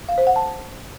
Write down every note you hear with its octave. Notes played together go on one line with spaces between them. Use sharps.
F5
C5
F#5
A5